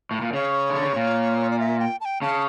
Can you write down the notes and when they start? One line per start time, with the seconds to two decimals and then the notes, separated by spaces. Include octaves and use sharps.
0.11 A2
0.21 A#2
0.33 C#3 C#5
0.70 D3
0.83 C#3
0.96 A#2
1.50 D5
1.59 E5
1.79 G5
2.00 A5
2.05 G5
2.21 C#3 A5